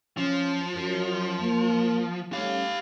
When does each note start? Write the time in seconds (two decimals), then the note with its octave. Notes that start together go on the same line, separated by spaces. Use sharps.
0.17 F3 C#4
0.75 F#2
1.41 A#3
2.33 G3 A3 C#4 G4 F5